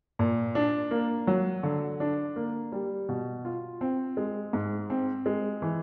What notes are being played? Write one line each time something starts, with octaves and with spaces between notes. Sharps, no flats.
A#2
D4
A#3
F#3
D3
D4
A#3
G3
B2
F4
C4
G#3
G#2
C4
G#3
E3